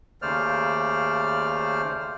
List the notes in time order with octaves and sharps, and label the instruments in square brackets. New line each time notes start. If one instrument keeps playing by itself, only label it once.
[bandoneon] D#2 C#3 A3 C5 D5 F6